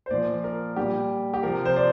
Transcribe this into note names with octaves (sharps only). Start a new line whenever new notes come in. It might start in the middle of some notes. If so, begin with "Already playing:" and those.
C5
A#2 F3 D5
A#4
A#2 G3 G4
G4
C3 F3 A#4
C5
D5